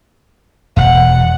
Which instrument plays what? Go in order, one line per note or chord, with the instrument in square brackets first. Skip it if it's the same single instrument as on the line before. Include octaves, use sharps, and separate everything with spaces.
[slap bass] E1 [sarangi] F#5